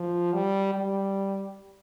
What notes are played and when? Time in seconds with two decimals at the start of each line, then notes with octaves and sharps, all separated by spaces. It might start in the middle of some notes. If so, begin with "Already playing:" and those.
Already playing: F3
0.33 G3
0.74 G3